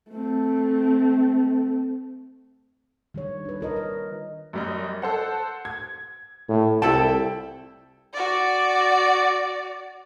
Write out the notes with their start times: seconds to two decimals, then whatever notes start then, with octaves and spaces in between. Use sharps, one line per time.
0.11 A3 C4
3.14 D#3 G3 D4 C#5
3.45 D4 B4
3.61 F4 A#4 D#5
3.76 D#5
4.53 F#2 G3 D#5
5.02 A4 C5 F#5
5.65 G#6
6.48 A2
6.82 C2 E4 A4 G5 A5
8.14 F#4 D5